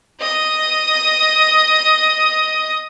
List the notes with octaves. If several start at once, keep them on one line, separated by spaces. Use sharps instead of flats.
D#5 D#6